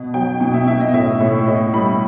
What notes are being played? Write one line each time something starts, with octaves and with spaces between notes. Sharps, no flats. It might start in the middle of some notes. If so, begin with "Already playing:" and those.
Already playing: B2
F#3 G5
B2 G5
E5
B2 E5
D#5
A2 E5
A2
A2 D#5
G3 B5